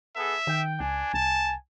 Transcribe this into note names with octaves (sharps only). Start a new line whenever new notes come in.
B3 G#4 A4 E5
D#3 G5
C#2 D4 G#5
C2 A5